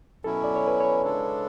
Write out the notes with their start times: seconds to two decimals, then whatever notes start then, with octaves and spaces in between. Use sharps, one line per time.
0.24 B2 F#3 C#4 E4 A4
0.44 D5
0.56 C#5
0.68 B4
0.80 C#5
1.02 C#3 G#3 D4 A4